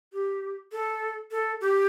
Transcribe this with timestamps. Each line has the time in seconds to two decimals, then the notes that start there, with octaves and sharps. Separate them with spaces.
0.13 G4
0.72 A4
1.31 A4
1.61 G4